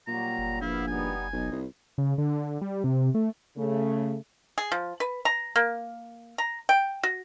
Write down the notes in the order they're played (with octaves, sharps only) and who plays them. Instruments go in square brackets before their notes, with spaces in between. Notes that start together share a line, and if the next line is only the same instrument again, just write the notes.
[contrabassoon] A#2 [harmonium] F#3 G3 [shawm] A#5
[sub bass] F#1
[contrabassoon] A#1 [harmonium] B3 F5 [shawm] E4
[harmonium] G3 B3 D#4 [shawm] G#5
[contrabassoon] B1 [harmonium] D#4
[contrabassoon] C2
[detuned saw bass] C#3
D3
G3
C3
A3
[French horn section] C#3 A3
[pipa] G#4
F3
B4
A#5
A#3
A#5
G5
F#4